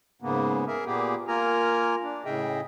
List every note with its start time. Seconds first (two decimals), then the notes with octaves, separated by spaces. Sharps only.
0.22 G#2 C#3 A#3 B3
0.67 G#4 A#4 E5
0.86 A#2 A#3 B3 G4 G#4
1.28 A#3 F4 A#4 G#5 A#5
2.02 D4
2.25 A2 C#3 G#4 D#5 E5 G5